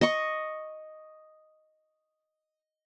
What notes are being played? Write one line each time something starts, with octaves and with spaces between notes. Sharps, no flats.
D#5 C#6